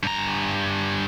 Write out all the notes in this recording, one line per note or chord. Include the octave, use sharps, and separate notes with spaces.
G2 A#5